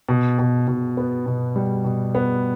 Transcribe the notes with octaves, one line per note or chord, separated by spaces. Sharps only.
B2
B2
B2
B3
B2
G3
B2
B3